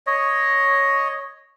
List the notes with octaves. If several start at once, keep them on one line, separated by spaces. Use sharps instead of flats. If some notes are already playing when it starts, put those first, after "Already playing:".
C#5 D#5